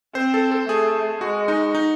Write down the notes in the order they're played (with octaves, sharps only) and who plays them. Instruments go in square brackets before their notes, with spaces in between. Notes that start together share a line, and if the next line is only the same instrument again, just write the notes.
[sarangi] C4 [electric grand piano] C5
[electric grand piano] A4
A4
[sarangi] A3 [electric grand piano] G#4
[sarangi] G#3 [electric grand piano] F#4
[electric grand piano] D#4
D#4